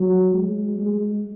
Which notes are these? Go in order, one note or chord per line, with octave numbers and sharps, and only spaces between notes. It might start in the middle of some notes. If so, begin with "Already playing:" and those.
Already playing: F#3
G#3
G#3